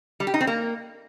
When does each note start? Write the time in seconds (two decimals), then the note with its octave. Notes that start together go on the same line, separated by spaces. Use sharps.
0.20 G3
0.27 G4
0.34 D#4
0.41 C4
0.47 A#3